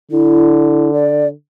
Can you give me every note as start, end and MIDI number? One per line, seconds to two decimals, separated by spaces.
0.11 1.32 50
0.11 0.90 64
0.93 1.28 74